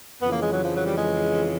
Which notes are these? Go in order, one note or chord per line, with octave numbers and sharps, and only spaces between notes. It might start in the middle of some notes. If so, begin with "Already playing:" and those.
F2 C#3 E3 B3
A#3
G#3
F#3
F3
F#3
G3
G#3